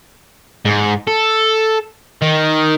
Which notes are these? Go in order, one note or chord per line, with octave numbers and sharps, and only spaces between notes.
G#2
A4
D#3